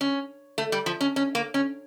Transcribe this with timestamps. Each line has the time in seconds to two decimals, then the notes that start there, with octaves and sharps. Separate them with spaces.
0.01 C#4
0.58 A3
0.72 G3
0.86 F3
1.01 C#4
1.16 C#4
1.35 A#3
1.54 C#4